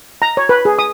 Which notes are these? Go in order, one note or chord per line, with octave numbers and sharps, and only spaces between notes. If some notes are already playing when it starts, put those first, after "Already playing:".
A#5
C#5
B4
G#4
D#6